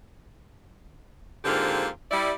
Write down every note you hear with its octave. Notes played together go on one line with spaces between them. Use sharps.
G#2 D3 A#3 C4 F4 G4
G3 E4 D5